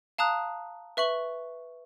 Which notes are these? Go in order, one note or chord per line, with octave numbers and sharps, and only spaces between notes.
F5 A5 A#5 D#6 F#6
B4 E5 C#6 F#7